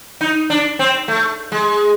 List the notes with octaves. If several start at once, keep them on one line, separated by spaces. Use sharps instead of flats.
D#4
D4
C4
A3
G#3